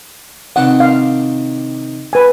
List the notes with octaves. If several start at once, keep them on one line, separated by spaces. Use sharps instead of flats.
C3 D#3 D4 F#5
F5
B4 G#5